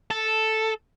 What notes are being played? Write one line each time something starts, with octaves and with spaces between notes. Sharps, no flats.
A4